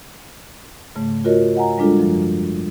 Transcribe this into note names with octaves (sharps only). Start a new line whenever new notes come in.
G#2 C#3 A3
F4 F#4 A#4 C#5 D#5
D#5 F#5 G#5 A#5
G3 G#3 D4 F4 A4
F#2 F3